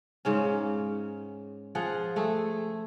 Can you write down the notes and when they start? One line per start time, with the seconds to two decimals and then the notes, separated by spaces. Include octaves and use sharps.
0.25 G#2 C#3 C#4
1.75 F3 G#4 F#5
2.16 A3 G#4